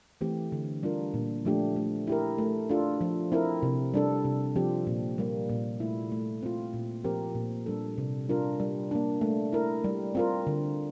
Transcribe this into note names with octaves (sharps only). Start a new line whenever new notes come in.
E3 A3 C4 G4
D3
G3 D4 F4 A#4
A#2
F3 A3 D4 G4
A3
E4 G4 A#4
A3
D4 F4 A4
F3
C4 E4 A#4
C3
G3 D4 A4
C3
F3 C4 G4
A#2
G3 A#3
A#2
A3 E4
A3
C4 F4
A#2
F3 C4 G4 A#4
A#2
G3 D4 A4
C3
G3 D4 F4 A#4
G3
A#3 D4
A3
E4 A#4
G3
C4 F4 A#4
D3